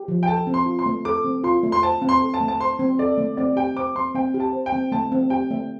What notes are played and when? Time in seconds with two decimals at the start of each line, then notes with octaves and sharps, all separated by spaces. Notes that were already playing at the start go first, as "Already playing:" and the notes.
Already playing: G4
0.08 F3
0.23 G5
0.27 A4 A5
0.47 C4
0.54 C6
0.66 F4
0.79 C6
0.86 A3
1.05 A4 D6
1.25 C4
1.44 F4 C6
1.63 A3
1.72 C6
1.82 C5 A5
2.02 C4
2.09 C6
2.21 A4
2.34 A5
2.41 A3
2.48 A5
2.60 C5 C6
2.79 C4
2.99 A4 D5
3.18 A3
3.37 C4 D5
3.56 G4 G5
3.76 C5 D6
3.96 C4 C6
4.15 C4 G5
4.34 G4
4.40 A5
4.53 C5
4.66 G5
4.72 C4
4.92 A3 A5
5.12 C4
5.30 G4 G5
5.51 A3